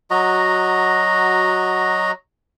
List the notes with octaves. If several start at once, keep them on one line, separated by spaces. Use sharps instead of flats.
F#3 F#4 D#5 A#5